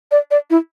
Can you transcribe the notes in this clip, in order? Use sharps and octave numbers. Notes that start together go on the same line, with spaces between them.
D5
D5
E4